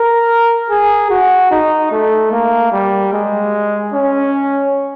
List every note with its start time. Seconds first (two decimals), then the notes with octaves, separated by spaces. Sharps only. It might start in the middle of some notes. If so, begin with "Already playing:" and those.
Already playing: A#4
0.70 G#4
1.10 F#4
1.51 D#4
1.92 A3
2.32 A#3
2.72 G3
3.13 G#3
3.93 C#4